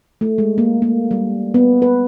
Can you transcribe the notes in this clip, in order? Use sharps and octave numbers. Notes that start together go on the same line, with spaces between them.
A3
G#3
A#3
A#3
G3
B3
B4